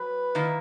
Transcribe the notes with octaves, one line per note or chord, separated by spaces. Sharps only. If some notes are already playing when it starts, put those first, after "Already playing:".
Already playing: F#3 B4
D#3 A#3 E4